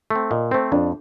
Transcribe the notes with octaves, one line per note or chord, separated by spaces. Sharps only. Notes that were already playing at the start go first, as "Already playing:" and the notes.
A3 C4
A#2 D#5
A3 C4 C5
F2 D4